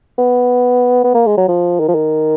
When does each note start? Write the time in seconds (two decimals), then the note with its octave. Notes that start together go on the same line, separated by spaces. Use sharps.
0.18 B3
1.04 B3
1.15 A#3
1.27 G#3
1.37 F#3
1.48 F3
1.80 D#3
1.88 F3
1.95 D#3